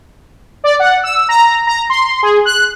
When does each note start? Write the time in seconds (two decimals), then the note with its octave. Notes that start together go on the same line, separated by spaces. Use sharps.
0.64 D5
0.79 F#5
1.03 E6
1.29 A#5
1.67 A#5
1.90 C6
2.23 G#4
2.45 F#6